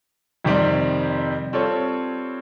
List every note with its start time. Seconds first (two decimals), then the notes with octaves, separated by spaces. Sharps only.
0.45 F2 C3 D#3 G3 C4
1.53 G3 C4 F4 A4 C#5